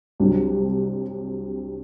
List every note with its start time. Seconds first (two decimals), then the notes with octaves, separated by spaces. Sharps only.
0.20 C2 C3 F#3 D4